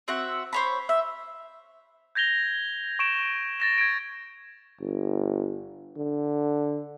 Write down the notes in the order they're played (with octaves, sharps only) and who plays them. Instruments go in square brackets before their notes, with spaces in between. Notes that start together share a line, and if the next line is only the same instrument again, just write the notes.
[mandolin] C4 F#4 E5 F#5
C5 C#5 B5
E5
[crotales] G6 G#6 A#6 F7 G7
C#6 D7 E7
A6 A#6 E7
G#6 D7
[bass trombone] G1
D3